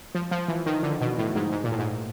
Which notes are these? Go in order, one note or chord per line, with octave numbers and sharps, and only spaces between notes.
F3
F3
E3
D#3
D3
B2
A2
G#2
G#2
A#2
A2
G#2